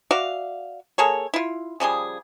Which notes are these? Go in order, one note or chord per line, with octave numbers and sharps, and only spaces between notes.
F#4 D5 E5 F5
A#3 G#4 A4 C#5
E4 F4
C#3 F3 G3 G#4